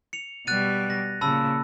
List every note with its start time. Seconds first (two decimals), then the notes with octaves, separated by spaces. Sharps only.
0.13 C#7 F7
0.47 B2 G3 F#6 A6 D#7
0.90 A#6
1.21 A#2 C#3 A5 B5 E6